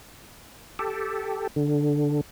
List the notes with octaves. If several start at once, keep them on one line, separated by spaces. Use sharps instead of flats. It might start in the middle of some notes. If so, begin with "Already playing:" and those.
G4 A4
D3